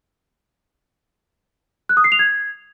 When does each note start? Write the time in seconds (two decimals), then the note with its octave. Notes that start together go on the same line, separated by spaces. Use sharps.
1.89 F#6
1.97 D#6
2.04 C7
2.12 F7
2.19 G#6